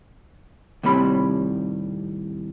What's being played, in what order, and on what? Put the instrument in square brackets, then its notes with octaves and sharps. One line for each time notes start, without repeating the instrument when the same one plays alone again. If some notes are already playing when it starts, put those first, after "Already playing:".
[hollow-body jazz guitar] D#2 A2 C3 G3 B5